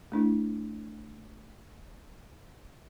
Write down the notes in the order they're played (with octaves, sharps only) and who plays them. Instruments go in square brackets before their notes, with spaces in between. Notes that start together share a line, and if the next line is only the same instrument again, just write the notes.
[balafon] A3 D4 E4